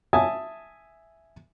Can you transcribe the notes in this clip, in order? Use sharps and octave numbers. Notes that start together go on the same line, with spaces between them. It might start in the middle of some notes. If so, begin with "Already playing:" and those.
E5 G#5 A5 D#6